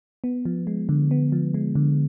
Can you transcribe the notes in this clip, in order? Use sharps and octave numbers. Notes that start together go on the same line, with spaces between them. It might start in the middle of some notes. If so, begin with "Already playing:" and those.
B3
F3
G#3
D3
B3
F3
G#3
D3